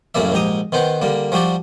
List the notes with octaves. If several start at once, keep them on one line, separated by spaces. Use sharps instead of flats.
F#2 A2 C#3 A#3 D5 E5
A#1 G#2 G4 A#5 D#6
D#3 B3 C5 F#5 G5
D3 G3 A#3
F3 G3 F#4 G4 D5